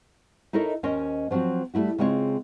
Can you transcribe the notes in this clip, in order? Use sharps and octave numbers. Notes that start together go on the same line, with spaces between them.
D#4 E4 A4 A#4 C#5 D#5
D#2 C#4 A#4 C5 C#5 D#5
F3 F#3 C4 F4 F#4
G3 A3 E4 F#4
C#3 G#3 C4 F4 C#5